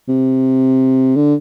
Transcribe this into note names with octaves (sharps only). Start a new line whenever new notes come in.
C3
D3